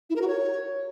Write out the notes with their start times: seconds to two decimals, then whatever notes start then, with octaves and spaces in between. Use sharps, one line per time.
0.10 E4
0.16 A#4
0.22 F#4
0.28 C#5